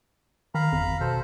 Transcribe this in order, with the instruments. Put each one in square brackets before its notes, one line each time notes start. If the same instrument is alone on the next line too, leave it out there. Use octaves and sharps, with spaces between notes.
[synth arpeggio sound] D#3 [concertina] F5 A#5 B5
[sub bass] G1 [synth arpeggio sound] F2
[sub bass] G#1
[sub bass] B2 [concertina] A4 C5